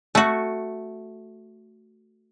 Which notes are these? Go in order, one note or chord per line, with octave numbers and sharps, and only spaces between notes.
A3 F#4